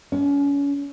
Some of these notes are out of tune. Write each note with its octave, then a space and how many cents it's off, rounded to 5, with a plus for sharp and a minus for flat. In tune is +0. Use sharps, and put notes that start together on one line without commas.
C#4 +35